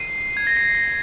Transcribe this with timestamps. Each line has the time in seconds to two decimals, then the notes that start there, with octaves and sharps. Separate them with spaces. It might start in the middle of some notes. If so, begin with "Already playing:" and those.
Already playing: C7 D#7
0.37 G#6
0.47 A#6
0.57 C7
0.75 A#6